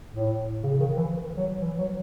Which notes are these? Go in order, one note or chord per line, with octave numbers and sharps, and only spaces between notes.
A2
C#3
C#3
D#3
E3
F#3
E3
F#3